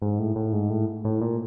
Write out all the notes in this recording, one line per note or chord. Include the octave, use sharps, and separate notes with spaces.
G#2
A2
A2
G#2
A2
A2
A#2